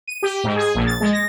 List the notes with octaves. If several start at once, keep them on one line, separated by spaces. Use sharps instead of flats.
D#7
G4
G#2
G#4
A#1
A6
G#3
A#6